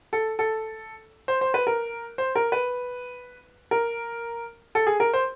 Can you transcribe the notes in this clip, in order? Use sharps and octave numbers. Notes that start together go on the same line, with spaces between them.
A4
A4
C5
C5
B4
A#4
C5
A#4
B4
A#4
A4
G#4
A#4
C5